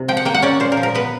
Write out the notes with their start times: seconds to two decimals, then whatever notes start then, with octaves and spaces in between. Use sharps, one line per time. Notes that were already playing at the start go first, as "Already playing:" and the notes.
Already playing: C3
0.08 F3 G5
0.17 F#5
0.25 A#3 G5
0.34 F#5
0.42 C#4 D5
0.60 A#2 C5
0.72 A#4
0.77 F3
0.83 A#4
0.95 B3 B4